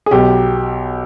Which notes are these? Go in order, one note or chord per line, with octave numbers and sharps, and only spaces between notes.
G#4
B1 B2 F#3 G4